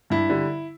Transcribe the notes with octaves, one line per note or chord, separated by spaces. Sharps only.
G2 E4
D3 G3